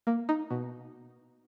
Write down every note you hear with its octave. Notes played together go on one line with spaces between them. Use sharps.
A#3
D#4
B2